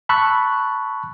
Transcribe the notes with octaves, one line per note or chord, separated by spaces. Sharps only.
A5 B5 C#6 E6 F#6